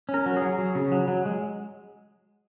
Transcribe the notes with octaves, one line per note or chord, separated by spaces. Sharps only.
C#4
A#4
F#3
G#4
F#3
F#3
C#3
F#3
F#3
G#3